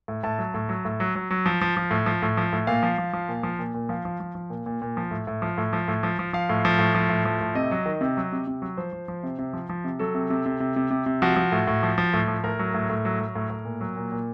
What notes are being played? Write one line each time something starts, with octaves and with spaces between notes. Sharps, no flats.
A2
A2 A5
F#3
A2
F#3
A2
F#3
F#3
F#3
F3
F3
F3
A2
F3
A2
F3
A2
A#2 F5
F3
F3
F3
A#2
F3
A#2
A#2
F3 F5
F3
F3
F3
A#2
A#2
A#2
F3
A2
A2
F3
A2
F3
A2
F3
F3
F3 F5
A2
F3
A2
F3
A2
F3
A2
C3 D#5
F#3
D#3
C3
F#3
C3
C3
F#3
F3 C5
F3
F3
C3
C3
F3
F3
C3
F#3 A4
C3
C3
C3
C3
C3
C3
C3
F3 F#4
F3
A2
A2
F3
F3
A2
F3
A2 A#4
F#3
A2
A2
F#3
F#3
A2
A2
A#2
F#3
A#2
A#2